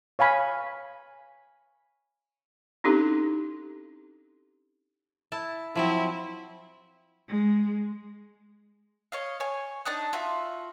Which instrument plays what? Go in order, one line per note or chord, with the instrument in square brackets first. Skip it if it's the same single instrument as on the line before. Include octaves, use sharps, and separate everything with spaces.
[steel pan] C#5 F5 G#5 B5
[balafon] C4 C#4 D#4 E4 G4 A4
[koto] E4 A5
[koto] F3 F#3 C4 [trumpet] E4
[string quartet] G#3
[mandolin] C#5 D#5 F5
C#5 G#5
D4 D#4 D#6 F#6
F4 F#4 E5